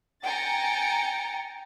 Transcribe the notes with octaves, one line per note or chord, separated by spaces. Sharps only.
G5 G#5 A#5 A6 C#7